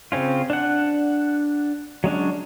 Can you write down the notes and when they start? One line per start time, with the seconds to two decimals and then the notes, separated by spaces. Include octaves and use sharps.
0.12 C#3 C4 C#4 F4
0.50 D4 F#5
2.04 F#3 G#3 C#4 D4